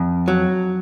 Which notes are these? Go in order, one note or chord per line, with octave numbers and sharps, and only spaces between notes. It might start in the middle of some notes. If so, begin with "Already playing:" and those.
Already playing: F2
F#3